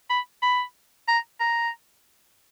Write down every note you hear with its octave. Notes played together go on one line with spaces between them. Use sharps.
B5
B5
A#5
A#5